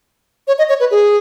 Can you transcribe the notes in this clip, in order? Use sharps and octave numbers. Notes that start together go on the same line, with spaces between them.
C#5
D#5
C#5
B4
G#4